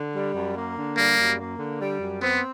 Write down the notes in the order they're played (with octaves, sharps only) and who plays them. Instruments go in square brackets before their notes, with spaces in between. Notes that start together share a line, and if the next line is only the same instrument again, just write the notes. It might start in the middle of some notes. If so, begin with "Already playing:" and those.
Already playing: [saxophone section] D3
G3
F#2
A#3
D3
[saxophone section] G3 [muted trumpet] A#3
[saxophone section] F#2
A#3
D3
G3
F#2
[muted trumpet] B3 [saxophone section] C4